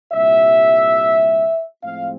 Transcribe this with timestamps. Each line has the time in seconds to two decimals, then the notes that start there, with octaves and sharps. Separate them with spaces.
0.12 C2 A#2 G3 E5
1.82 A2 F3 G#3 C4 F5